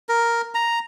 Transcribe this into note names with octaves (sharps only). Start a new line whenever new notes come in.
A#4
A#5